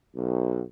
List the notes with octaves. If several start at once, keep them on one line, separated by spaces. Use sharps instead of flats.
B1